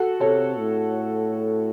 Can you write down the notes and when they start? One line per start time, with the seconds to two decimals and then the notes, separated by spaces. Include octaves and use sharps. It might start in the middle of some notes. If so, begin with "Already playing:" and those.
Already playing: F#4 A4
0.20 C3 A4 C#5
0.59 A2